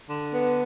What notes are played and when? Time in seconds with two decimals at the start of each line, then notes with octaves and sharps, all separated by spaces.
0.10 D3
0.32 B3